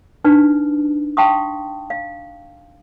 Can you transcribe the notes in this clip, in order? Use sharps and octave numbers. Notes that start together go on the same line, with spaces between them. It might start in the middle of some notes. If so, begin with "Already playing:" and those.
D4 D#4 B4
F5 G5 A5 C6 C#6 D#6
F5